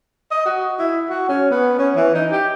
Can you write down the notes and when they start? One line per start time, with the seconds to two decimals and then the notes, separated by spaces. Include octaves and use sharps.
0.31 D#5
0.45 F#4
0.79 E4
1.10 F#4
1.29 C#4
1.51 B3
1.79 C#4
1.95 E3
2.14 D#4
2.32 G4